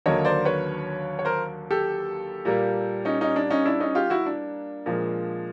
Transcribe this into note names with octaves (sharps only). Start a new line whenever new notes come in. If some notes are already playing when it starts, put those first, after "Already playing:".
D#2 D3 F#3 A#3 C#5 D#5
C5 D5
B4 C#5
C#5
A#4 C5
G4 A4
A#2 G3 A#3
C#4 D#4
C#4 D#4
D4
C#4 D#4
D4 E4
C#4 D#4
F4 G4
E4 F#4
D4
A#2 F3 G#3